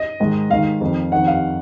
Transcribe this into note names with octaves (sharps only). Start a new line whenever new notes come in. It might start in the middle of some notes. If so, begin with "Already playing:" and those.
Already playing: D#5
G#2 D#3
G#2 D#3 F5
F2 D#3
F2 D#3 F#5
F5